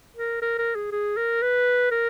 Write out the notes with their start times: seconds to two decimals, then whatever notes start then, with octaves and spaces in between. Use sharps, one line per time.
0.16 A#4
0.42 A#4
0.58 A#4
0.75 G#4
0.92 G#4
1.17 A#4
1.42 B4
1.91 A#4